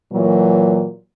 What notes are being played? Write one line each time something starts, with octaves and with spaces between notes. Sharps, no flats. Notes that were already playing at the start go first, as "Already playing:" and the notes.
A#2 E3 F#3